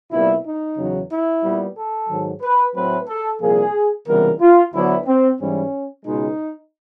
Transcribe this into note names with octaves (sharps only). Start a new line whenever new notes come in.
C2 A#2 G3 B3 E4
D#4
E2 C#3 F#3
E4
A#2 G3 B3
A4
G#2 D#3 F#3
B4
A2 F#3 A3 C4 B4
A4
C2 A#2 F3 A#3 G#4
C#2 C3 E3 G3 B3 A#4
F4
D2 D3 F#3 B3 E4
C4
G#2 E3 G3 C#4
C#2 B2 G#3 D#4